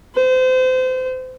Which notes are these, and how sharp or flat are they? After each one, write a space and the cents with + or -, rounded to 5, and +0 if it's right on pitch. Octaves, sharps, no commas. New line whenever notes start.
C5 -30